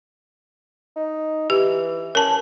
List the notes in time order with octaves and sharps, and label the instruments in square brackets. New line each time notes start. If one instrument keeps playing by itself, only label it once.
[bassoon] D#4
[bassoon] E3 [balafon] G4
[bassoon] C#4 [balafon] A#4 A5